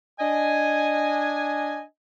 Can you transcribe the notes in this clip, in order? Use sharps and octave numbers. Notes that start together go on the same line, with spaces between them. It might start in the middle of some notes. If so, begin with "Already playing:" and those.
D4 D#5 G#5